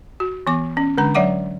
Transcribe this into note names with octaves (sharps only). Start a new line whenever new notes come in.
F#4
E3 B3 D6
C#4
D3 G#3 D4 A#5
F#3 C#5 E5 F#5 D6